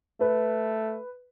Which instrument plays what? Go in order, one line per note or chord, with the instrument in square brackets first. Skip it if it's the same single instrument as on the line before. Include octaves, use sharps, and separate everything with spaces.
[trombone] A3 [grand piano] B4